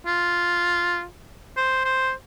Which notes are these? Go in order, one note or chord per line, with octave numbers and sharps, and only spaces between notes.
F4
C5
C5